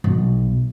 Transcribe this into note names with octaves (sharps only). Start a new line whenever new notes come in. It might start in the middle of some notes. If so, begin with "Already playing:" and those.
B1